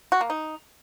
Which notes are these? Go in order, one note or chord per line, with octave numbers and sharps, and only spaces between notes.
F#4
A#3
D#4